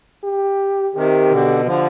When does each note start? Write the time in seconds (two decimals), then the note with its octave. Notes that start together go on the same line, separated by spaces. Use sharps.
0.24 G4
0.95 C3 D#3 G4
1.30 B2 D3
1.65 D3 F3